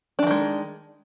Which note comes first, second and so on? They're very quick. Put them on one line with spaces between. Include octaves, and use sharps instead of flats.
D4 E3 D#3 G#3